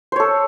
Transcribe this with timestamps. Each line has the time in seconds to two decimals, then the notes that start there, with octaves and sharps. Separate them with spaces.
0.12 C5
0.16 C#5
0.20 A4